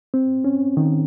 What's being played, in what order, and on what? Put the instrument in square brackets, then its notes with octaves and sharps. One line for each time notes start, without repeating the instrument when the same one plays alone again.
[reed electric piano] C4
C#4
D#3